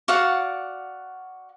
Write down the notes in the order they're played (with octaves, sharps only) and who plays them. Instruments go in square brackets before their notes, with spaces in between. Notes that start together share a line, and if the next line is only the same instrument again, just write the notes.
[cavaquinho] F#4 D5 F5 F#5